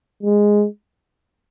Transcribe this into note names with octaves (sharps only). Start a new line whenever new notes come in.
G#3